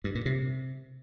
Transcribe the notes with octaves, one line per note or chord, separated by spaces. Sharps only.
G2
A#2
C3